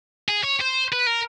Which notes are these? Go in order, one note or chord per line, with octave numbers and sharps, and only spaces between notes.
G#4
C#5
C5
B4
A#4